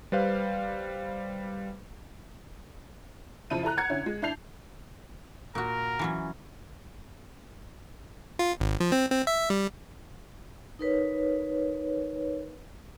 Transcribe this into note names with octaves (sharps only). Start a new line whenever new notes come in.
G3 B4 C5 F5
F2 C#3 F3 E4 D#7
E4 A4 A#5 F#6
F#5 A#5 G#6 C#7
D3 C#4 E4
G#3
D4 E4 A5 G6 C7 F7
A#2 F#4 A#4
E3 F#3 C#4
F4
G#1
F3
C4
C4
E5
G3
D#4 A#4 B4 C#5